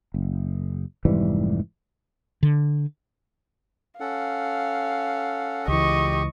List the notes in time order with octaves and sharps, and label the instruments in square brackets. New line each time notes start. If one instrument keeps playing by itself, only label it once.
[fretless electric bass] F#1
F1 G#2 E3 G3
D3
[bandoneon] C#4 A4 F#5 [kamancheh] F5
[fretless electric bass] C#2 E3 [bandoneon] G4 [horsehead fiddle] D#5 [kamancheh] C#6